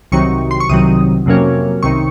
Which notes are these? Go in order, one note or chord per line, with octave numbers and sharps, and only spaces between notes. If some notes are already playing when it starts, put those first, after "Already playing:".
C2 C3 D#3 F#3 C#6
C6
C#6
C2 C3 D#3 F#3 D#6
F2 C3 F#3 A#3 C#4
C2 C3 D#3 C#6